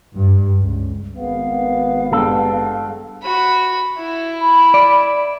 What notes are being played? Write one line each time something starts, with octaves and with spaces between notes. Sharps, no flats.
G2
C#2
G#1 B3 F5
G2 G#3 A4 G5
F#4 B5
E4
B5
D5